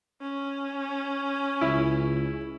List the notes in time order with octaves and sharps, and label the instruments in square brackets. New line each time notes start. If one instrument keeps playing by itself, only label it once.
[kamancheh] C#4
[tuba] C#2 [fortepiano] E4